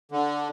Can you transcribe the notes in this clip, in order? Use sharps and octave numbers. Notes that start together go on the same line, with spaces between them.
D3